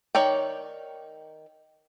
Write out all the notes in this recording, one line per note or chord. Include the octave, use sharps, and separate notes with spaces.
D#3 C#5 D5 G5